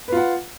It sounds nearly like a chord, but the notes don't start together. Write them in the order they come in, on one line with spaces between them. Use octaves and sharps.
B4 F4 F#5